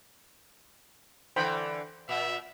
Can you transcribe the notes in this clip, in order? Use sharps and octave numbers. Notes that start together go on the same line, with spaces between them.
D3 E3 C5 G5 B5
A#2 E5